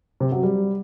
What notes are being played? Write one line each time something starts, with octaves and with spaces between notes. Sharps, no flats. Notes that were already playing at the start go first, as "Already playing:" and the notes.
C3
F#3
G3